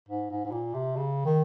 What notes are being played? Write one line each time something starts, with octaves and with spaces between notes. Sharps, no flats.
G#2
G#2
G#2
A#2
C3
C#3
D#3